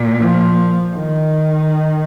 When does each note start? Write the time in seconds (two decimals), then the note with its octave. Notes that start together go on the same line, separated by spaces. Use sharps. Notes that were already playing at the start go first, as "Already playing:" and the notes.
Already playing: A#2
0.19 F3
0.96 D#3